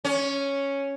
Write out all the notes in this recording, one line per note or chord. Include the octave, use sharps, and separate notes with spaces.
C#4